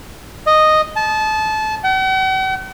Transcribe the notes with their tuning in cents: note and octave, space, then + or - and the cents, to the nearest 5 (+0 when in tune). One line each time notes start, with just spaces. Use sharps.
D#5 -5
A5 -25
F#5 +45